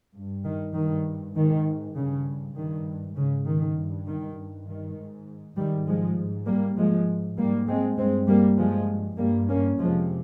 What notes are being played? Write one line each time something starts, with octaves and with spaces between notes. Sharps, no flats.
G2
D#3
G2 D#3
G#2 D#3
G2 C#3
G2 D#3
G#2 C#3
D#3
G2
D#3
G2
D#3
G#2
G#2 D#3 G3
F3 G#3
G#2
G3 A#3
G#2 F3 G#3
G#2 G3 A#3
G#3 C4
G2 G#3 C4
G3 A#3
G2 F3 G#3
G2 G3 A#3
A#3 C#4
F2 C3 F3 G#3